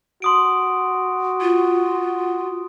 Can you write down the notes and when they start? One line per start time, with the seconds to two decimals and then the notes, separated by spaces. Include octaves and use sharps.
0.22 F#4 C6 D#6 D7
1.41 F4